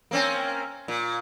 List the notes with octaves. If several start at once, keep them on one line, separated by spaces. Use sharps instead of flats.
A#3 C4 C#4
A#2